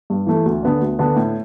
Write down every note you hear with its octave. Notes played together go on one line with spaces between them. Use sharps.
G2
E3 A3
D2
D3 B3 D4
D2
D3 B3 D4
A2